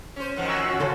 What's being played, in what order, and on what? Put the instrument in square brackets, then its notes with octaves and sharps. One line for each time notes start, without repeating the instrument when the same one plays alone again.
[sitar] C#4 C5
[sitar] F#2 D#3 F3 [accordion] F#5
[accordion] G#5 A#5 [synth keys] C#6 E6 F#6
[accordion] C#4 F#4
[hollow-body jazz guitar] C#3 A4 C5